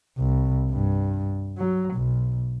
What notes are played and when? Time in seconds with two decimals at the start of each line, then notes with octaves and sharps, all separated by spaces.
0.17 C2
0.71 G2
1.58 F#3
1.94 B1